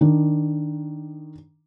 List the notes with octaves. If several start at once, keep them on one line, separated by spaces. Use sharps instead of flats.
D#3 D4